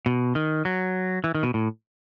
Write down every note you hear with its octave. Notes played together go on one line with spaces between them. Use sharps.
B2
D#3
F#3
E3
D#3
B2
A2